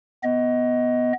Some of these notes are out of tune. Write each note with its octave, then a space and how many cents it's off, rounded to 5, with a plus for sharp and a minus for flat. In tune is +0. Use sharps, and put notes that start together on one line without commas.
B3 +5 D#5 +15